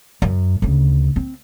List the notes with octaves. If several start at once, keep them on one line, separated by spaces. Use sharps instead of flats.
F#2
D2 C#3
C4